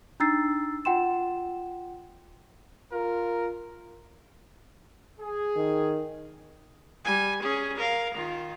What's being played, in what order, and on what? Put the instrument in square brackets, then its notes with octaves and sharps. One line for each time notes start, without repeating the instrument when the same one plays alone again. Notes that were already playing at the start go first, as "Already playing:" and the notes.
[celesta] D4 D#4 A#5 E6 A6 C7
F4 F#5 G5 C6 E7
[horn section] F4 A#4
[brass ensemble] G#4
[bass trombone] D#3
[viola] G3 G#5
C#4 G#4
A#4 F5
D#3 F4